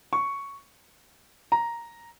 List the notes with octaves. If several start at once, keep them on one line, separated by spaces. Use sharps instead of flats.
C#6
A#5